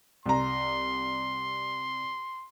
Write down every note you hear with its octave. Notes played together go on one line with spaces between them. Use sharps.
C2 A#5 C6